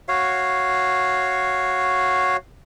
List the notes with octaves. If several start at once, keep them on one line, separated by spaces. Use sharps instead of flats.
F#4 C#5 F5